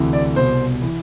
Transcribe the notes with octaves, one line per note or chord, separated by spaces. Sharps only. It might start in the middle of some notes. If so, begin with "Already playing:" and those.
Already playing: D2 C3 E3
D5
C2 B2 C5
E3